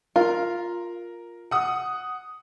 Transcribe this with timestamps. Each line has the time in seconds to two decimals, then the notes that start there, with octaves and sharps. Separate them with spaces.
0.16 F4 A#4
1.51 F#5 D#6